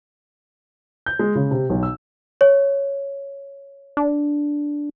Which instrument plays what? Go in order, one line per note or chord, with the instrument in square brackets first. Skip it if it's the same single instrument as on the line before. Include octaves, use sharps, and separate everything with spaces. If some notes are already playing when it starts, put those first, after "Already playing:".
[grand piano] G6
G#3
C#3
C3
B1
E6
[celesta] C#5
[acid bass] D4